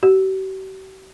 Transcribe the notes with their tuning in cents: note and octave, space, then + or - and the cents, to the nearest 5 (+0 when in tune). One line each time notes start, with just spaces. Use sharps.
G4 -45